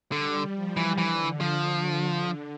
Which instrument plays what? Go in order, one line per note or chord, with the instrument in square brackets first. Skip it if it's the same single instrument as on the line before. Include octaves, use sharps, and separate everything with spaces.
[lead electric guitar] D3 [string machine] G3
[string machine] F3
[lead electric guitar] E3
[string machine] D3 [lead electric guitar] E3
[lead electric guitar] F3